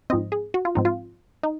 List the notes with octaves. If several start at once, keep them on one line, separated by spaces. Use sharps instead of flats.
G#2 F3 C4 D#5
G#4
F#4
F4
G#2 F3 C4 D#4
F4
D#4